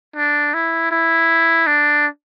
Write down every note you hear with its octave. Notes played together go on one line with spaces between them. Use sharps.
D4
E4
E4
D4